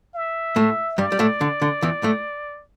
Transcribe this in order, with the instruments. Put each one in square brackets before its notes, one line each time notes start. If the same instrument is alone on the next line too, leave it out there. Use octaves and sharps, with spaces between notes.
[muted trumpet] E5
[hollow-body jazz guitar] A2 A3
[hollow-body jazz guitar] G2 G3 [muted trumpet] D5
[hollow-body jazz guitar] G3
A2 A3
D3
D3
E2 E3
A2 A3